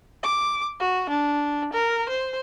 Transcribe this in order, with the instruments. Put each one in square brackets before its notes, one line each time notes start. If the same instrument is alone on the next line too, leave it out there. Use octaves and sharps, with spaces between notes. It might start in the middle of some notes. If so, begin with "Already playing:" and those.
[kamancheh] D6
F#4
D4
A#4
C5